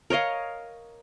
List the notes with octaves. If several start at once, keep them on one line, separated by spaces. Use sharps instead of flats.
A#4 C#5 D#5 F5